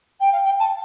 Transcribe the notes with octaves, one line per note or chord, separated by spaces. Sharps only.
G5
F5
G5
A5